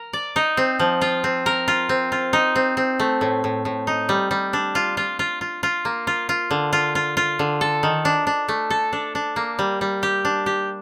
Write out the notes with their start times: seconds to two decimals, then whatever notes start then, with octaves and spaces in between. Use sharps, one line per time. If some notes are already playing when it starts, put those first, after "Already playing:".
Already playing: A#4
0.13 D5
0.36 D#4
0.57 C4
0.79 F3
1.01 F4
1.24 C4
1.46 A#4
1.68 F4
1.89 C4
2.12 F4
2.33 D#4
2.56 C4
2.77 C4
3.00 A3
3.21 A2
3.44 A2
3.65 A2
3.87 D#4
4.09 G3
4.31 G3
4.53 D4
4.75 F4
4.97 F4
5.19 F4
5.41 F4
5.63 F4
5.85 A#3
6.07 F4
6.29 F4
6.51 D3
6.73 F4
6.95 F4
7.17 F4
7.39 D3
7.61 A4
7.83 D#3
8.05 D4
8.27 D4
8.48 A3
8.70 A4
8.93 D4
9.15 D4
9.36 A#3
9.59 G3
9.81 G3
10.03 G4
10.25 D4
10.46 G4